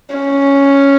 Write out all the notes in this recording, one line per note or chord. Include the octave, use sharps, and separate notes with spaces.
C#4